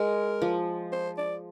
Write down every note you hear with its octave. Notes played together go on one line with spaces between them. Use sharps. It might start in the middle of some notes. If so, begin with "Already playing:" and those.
Already playing: G#3 A#4
F3
C5
D5